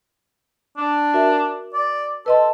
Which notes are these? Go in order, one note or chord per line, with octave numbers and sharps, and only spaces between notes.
D4
F#4 A#4 E5
D5
A4 B4 D#5 C6